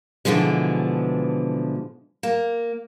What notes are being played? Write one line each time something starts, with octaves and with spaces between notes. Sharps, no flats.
B2 D3 E3 F3 G#3
A#3